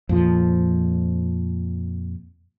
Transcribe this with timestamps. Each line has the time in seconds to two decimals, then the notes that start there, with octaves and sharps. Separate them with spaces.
0.09 F2 A#2 F3